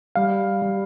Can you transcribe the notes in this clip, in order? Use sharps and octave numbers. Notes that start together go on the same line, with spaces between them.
G3 F5
G3